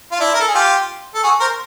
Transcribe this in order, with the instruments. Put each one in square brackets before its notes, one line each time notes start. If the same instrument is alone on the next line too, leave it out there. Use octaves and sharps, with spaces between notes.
[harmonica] F4
D4 E4
A#4
A4
G#4
F4 G4
A4
F#4 G#4
A#4 C5